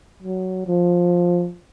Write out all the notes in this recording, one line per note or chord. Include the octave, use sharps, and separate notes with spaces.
F#3
F3